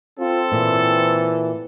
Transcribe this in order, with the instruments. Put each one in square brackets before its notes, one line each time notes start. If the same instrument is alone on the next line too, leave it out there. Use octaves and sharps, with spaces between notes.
[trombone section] C4 [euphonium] F4 [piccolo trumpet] A4
[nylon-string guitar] A#2 [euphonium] E3